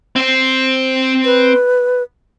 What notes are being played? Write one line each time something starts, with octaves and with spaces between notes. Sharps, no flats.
C4 C5
B4